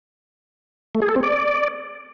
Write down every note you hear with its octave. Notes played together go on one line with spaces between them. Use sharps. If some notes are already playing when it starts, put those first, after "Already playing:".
A3
G#4
A4
C4
D5